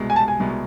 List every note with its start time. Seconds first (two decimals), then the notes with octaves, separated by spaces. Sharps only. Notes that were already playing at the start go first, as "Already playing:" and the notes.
Already playing: C2 B2 G#3
0.10 G#5
0.16 A5
0.28 G#5
0.40 C2 B2 G#3